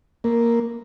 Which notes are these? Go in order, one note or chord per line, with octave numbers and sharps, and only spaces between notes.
A#3